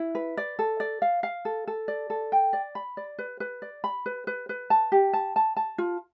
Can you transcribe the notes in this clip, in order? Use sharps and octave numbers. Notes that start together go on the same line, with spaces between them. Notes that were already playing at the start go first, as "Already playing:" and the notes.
Already playing: E4
B4
D5
A4
D5
F5
F5
A4
A4
D5
A4
G5
D5
B5
D5
B4
B4
D5
B5
B4
B4
B4
A5
G4
A5
A5
A5
F4